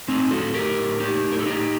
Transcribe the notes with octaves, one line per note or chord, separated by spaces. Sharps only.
A2 C4 D#4
A2 F#4 A4
A2 G4 A#4
A2
A2 D#4 G4
A2
A#4
A4
A2 D#4 G4